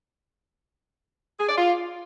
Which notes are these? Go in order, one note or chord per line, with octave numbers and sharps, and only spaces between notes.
G#4
D5
F4